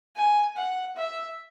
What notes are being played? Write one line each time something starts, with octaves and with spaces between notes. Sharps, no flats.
G#5
F#5
E5